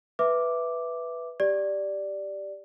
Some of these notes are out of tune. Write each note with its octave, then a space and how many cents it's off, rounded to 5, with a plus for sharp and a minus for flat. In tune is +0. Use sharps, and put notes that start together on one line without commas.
B4 +0 E5 +0 D6 +0
G4 +0 D5 +0